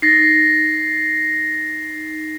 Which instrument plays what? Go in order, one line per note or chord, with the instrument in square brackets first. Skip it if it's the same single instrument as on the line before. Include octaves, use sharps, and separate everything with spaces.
[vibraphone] D#4 [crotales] A6 A#6 C7